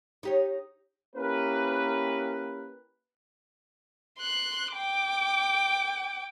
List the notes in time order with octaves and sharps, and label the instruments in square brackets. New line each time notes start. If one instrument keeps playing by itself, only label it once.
[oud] D#4 G4 C#5
[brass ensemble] A#3 C#4 E4 G4 A#4 B4
[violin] C6 F#6
G5 D6